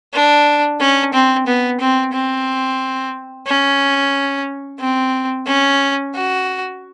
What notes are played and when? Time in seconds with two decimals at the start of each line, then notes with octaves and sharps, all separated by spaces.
0.13 D4
0.80 C#4
1.13 C4
1.47 B3
1.80 C4
2.13 C4
3.46 C#4
4.79 C4
5.46 C#4
6.14 F#4